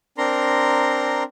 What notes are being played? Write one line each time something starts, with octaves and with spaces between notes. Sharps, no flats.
C4 D4 A#4 A#5 C6